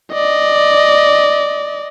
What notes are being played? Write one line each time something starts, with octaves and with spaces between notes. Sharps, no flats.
D5 D#5